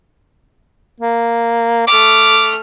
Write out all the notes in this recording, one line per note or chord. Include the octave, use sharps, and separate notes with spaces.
A#3
A3 D6 F6